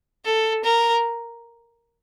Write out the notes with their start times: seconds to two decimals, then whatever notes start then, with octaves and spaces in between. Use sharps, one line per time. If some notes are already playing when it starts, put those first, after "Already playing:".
0.25 A4
0.64 A#4